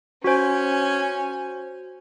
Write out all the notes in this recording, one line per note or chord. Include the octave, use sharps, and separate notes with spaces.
C#4 F#4 C5 G#5